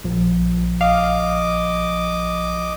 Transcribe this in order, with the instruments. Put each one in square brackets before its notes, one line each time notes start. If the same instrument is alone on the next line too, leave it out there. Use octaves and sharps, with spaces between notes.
[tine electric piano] A#1 F3
[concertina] D#5 D6 [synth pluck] F5